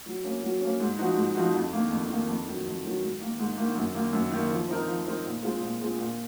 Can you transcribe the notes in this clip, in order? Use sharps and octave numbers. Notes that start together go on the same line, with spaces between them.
F#3
A#3 C#4
F#3
A#3 C#4
G#2
F3 C4 D#4 F#4
G#2
F3 C4 D#4 F#4
F2
D#3 A#3
F2
D#3 A#3
F2
D#3 F#3
F2
D#3 F#3
G#2
D#3 A#3
G#2
D#3 A#3
F#2
D#3 A#3
F#2
D#3 A#3
F3
C4 D#4 A#4
F3
C4 D#4 A#4
A#2
G#3 C4 F4 G#4
A#2
G#3 C4 F4 G#4
A#2